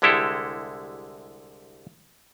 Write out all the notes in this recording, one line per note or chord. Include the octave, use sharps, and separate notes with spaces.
C2 D3 G#3 E4 G4 A4